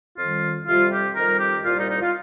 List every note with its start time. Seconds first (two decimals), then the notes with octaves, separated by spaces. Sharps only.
0.17 F2 D#3 G3 F4
0.66 F2 C3 G3 F4
0.91 G4
1.15 F2 D#3 G3 A#4
1.40 G4
1.64 C2 A#2 G3 F4
1.78 D#4
1.89 D#4
2.01 F4